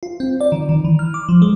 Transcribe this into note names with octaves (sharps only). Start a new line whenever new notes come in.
F4
C4
D5
D#3
D#3
E3
F6
D6
F3
G#3